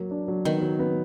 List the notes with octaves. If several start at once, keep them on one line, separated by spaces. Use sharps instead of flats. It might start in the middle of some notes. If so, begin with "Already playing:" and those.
Already playing: F#3 A#3
D4
F#3
D#3 B3
F#3
B3